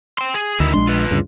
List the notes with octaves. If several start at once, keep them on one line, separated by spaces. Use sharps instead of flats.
G5 C6
G#4
D2 D#3 E4
A#1 G#3 D4 C6
F4 B4
D2 G2 C#3